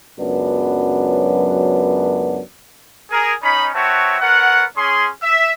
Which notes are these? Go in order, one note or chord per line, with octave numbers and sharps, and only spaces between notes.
C#2 F#2 F#3 B3 D4 B4
G#4 A#4
C#4 D#4 B5
C4 F#4 B4 C#5 E5 A5
B3 A#4 C#5 F#5
C#4 G#4 C6
E5